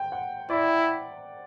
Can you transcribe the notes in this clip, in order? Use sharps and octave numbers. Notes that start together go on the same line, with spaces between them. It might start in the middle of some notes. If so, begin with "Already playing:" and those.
Already playing: G5
F#5
E4 D5